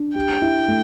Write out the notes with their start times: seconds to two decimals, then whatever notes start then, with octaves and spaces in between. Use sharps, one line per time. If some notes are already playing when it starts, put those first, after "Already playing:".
Already playing: D4
0.15 G4 G5
0.42 E4
0.68 A3